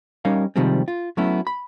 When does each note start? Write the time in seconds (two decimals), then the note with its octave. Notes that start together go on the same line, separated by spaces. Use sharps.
0.25 G3 C#4 D#4 A#4 F5
0.56 C3 D#3 F3 G3 G#3 C4
0.88 F4
1.17 F#3 A3 B3 C#4 E4
1.47 B5